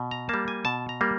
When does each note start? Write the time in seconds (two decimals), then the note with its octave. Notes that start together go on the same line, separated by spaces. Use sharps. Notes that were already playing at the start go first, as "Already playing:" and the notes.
Already playing: B2
0.11 A#5
0.29 G3 A#3 A5
0.48 G#5
0.65 B2 A5
0.89 A#5
1.01 G3 A#3